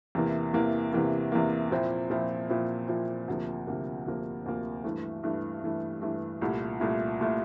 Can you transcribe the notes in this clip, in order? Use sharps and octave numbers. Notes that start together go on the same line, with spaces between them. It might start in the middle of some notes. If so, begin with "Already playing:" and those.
E2 C3 E3 A#3
E2 C3 E3 A#3
E2 C3 E3 A#3
E2 C3 E3 A#3
A#2 F3 C4 E4
A#2 F3 C4 E4
A#2 F3 C4 E4
A#2 F3 C4 E4
D2 C3 F3 A#3
D2 C3 F3 A#3
D2 C3 F3 A#3
D2 C3 F3 A#3
G2 E3 A3
G2 E3 A3
G2 E3 A3
G2 E3 A3
C2 A#2 A3 E4
C2 A#2 A3 E4
A#2 A3 E4